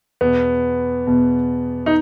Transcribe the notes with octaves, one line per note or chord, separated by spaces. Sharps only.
E2 B2 B3
E2 B2
D#4